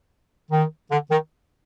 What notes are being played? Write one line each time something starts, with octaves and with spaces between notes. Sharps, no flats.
D#3
D3
D#3